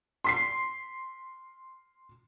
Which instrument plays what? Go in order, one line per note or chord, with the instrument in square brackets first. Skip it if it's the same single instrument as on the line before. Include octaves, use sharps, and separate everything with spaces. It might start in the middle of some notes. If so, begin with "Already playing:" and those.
[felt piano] C6 B6 C7